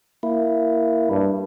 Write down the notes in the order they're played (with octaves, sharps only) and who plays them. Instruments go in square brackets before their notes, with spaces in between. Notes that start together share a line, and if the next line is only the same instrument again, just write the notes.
[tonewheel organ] A#3 E4
[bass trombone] G2